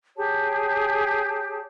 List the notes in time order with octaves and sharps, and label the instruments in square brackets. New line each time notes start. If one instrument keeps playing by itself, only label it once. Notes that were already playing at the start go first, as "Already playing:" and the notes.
[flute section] G4 G#4 C#5 A5